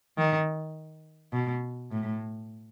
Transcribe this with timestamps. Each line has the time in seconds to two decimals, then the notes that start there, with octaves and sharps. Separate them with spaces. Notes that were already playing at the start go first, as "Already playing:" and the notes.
0.18 D#3
1.33 B2
1.92 A2